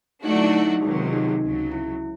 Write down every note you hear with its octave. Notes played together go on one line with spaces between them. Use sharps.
D3 F#3 A3 D4 D#4 F#4
E4
D#4
D#4
C#2 C3 D#3 F#3
D#4
D#4
C#2 C#3 F#3
E4